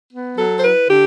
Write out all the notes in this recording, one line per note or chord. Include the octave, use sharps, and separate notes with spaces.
B3
F#3 A4
C5
E4 B4
D3 G4